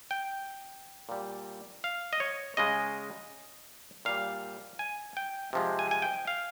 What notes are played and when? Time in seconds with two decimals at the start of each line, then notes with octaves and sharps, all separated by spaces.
0.11 G5
1.09 A#2 G3
1.84 F5
2.13 D#5
2.20 C#5
2.57 C#3 G#3 D#5
4.05 A#2 G3 F5
4.79 G#5
5.17 G5
5.53 C3 F3 G#3
5.79 G#5
5.91 G#5
6.02 G5
6.27 F5